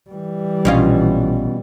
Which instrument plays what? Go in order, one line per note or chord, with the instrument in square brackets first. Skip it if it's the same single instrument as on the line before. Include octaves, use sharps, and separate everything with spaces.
[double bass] E3 G3
[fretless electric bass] A#1 [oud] B2 C#4 F4